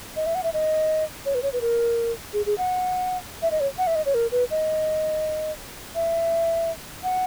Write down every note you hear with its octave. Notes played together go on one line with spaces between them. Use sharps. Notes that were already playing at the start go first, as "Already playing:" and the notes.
D#5
E5
F#5
E5
D#5
C#5
B4
C#5
B4
A#4
G#4
G#4
F#5
E5
D#5
C#5
F#5
E5
D#5
C#5
A#4
B4
D#5
E5
F#5